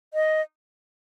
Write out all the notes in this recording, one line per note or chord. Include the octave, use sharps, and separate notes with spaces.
D#5